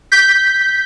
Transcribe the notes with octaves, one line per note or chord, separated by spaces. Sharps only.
G6 B6